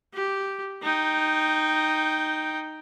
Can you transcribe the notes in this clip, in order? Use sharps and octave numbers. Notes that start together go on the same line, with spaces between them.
G4
D#4 G5